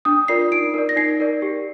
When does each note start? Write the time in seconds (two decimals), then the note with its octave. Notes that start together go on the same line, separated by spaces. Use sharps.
0.05 D4 D#6
0.28 F4 A#4 D5 C7
0.51 D#4 D7
0.74 A#4 D5
0.89 A#6
0.96 D#4 C7
1.20 A#4 D5
1.42 G4